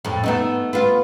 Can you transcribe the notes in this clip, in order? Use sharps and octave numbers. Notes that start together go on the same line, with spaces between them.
F2 A2
A3 B3 D#4
B3 F4